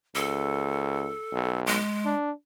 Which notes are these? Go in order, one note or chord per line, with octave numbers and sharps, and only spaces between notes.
C#2 A4
B1
G#3
D4